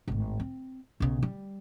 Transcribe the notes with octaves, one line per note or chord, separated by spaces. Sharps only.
G#1 A2
C4
B1 C#3
G3